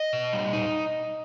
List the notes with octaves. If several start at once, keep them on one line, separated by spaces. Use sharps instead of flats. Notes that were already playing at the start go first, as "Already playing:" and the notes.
Already playing: D#5
B2
G3
D#4